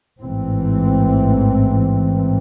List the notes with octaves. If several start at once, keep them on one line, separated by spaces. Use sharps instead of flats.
A1 G#2 E3 C4